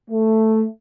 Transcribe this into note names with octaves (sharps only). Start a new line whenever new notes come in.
A3